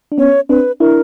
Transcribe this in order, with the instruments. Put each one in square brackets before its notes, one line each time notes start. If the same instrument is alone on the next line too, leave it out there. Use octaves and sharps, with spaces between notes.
[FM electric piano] D4
[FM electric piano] B3 C#4 [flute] C#5
[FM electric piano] C4 D4 [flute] B4
[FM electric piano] D4 E4 [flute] A#4